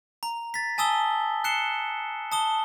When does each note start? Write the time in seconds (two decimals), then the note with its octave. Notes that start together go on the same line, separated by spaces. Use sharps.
0.23 A#5
0.54 A6 B6
0.78 G#5 A5 D#6 E6 G7
1.44 F#6 C7 C#7 E7 G7
2.32 A5 D#6 G7